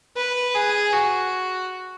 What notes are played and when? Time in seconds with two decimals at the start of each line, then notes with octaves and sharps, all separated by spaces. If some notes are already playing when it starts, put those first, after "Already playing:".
0.16 B4
0.55 G#4
0.93 F#4